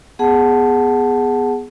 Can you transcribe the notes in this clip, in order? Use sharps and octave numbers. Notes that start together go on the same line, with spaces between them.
B3 G#4 F#5 A5